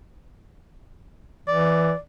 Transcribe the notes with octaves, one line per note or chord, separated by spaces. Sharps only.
E3 D5